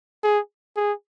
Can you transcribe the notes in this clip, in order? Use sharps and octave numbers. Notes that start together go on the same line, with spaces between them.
G#4
G#4